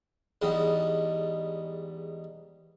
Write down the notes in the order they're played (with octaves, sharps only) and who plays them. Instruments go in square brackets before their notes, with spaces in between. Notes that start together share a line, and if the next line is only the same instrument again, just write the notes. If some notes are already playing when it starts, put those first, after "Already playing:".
[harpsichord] E2 G#2 G3